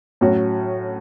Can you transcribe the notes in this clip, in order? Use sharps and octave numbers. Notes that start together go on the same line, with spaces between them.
A2 F#3 C#4 F#4